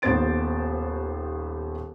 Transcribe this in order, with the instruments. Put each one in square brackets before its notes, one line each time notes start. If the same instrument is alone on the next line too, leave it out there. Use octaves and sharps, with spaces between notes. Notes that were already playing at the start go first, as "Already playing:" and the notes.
[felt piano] D#1 D#2 B3 C5 A6 D7